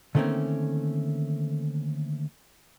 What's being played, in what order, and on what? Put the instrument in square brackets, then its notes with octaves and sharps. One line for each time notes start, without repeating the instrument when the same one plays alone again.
[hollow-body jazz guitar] D3 D#3 A3 A#3 C4 C#4